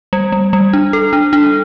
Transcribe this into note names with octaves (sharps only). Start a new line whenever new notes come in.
G3
G3
G3
D4
A4
D4
D4